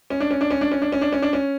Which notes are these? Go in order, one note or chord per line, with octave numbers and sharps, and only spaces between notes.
C#4
D4
C#4
D4
C#4
D4
C#4
D4
C#4
D4
C#4
D4
C#4